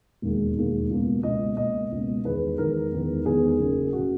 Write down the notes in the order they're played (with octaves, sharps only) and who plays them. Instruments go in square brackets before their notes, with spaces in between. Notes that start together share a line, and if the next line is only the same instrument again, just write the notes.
[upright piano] E1 D#2 D#3 G#3
E1 D#2 D#3 G#3
C#2 B2 A#3
C#2 B2 A#3 D#5
C#2 B2 A#3 D#5
C#2 B2 A#3
E2 D#3 G#3 B3 B4
E2 D#3 G#3 B3 A#4
E2 D#3 G#3 B3
E2 D#3 G#3 B3 G#4
F#1 F#2 C#3
C#3 F#4